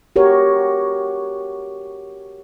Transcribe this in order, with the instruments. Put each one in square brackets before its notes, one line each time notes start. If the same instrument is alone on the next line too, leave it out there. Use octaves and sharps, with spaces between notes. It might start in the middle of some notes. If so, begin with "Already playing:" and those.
[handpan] F#4 G4 A#4 C#5